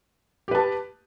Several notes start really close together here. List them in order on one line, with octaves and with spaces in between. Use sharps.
G4 B4 A5